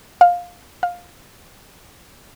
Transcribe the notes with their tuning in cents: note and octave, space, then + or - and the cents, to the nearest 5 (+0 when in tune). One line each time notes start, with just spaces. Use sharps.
F5 +15
F5 +15